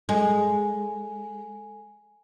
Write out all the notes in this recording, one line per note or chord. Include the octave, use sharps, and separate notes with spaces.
G#3 A4 G#5